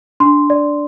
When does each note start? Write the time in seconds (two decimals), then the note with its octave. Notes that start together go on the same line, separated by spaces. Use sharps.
0.20 D4 C6
0.50 D5